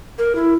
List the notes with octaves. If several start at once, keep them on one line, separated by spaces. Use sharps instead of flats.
A#4
E4